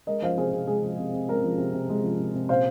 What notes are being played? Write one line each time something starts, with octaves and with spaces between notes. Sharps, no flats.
G#3 A#4 D#5
F3 C5 F5
C3 G#4 C5
C3 G#4
G#3 G#4
F3
C3
C3
G#3 A#4
F3
C3
C3
G#3
F3
C3
C3
A#2 C5 F5